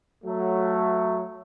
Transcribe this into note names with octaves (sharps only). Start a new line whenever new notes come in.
F#3 A3